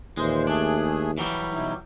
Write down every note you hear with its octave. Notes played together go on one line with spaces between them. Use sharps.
D#2 A#2 E3 G#3 C5
A3 D4 G#4
E3 F#3 G3
B2 D#4 E4